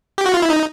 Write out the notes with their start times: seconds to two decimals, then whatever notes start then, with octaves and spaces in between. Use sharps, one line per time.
0.18 G4
0.26 F#4
0.34 F4
0.42 E4
0.50 D#4